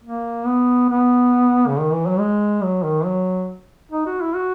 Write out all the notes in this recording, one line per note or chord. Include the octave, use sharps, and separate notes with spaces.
A#3
B3
B3
C#3
D#3
E3
F#3
G#3
F#3
D#3
F#3
D#4
F#4
E4
F#4